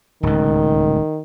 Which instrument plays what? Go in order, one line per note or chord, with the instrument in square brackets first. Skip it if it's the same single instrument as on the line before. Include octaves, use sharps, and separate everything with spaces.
[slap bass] D1 C#2 [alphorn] D#3